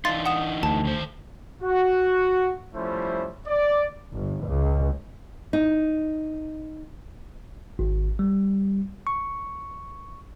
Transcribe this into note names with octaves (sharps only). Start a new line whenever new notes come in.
E3 D4 D#4 F5 C6 A6
F#5 D#6 E7
D2 A5
D#3 C5
F#4
F3 G3 A3 C#4 E4 C5
D5
G1
C#2
D#4
G#1
G3
C#6